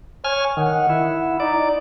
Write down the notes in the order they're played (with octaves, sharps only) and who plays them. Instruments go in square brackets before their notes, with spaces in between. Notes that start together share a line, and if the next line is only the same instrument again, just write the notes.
[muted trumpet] C#5 [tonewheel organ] G#5 F6
[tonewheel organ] D#3 [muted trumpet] F#5
[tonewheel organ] E4
[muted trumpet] D#4 [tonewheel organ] D5